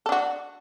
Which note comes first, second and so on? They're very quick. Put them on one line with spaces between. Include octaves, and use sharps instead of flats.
A4 D4 F#4